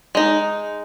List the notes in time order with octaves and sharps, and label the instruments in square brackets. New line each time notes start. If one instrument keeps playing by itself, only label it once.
[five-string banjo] G#3 D#4